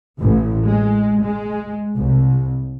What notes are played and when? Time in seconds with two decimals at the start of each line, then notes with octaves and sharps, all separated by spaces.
0.18 A1
0.66 G#3
1.21 G#3
1.96 C2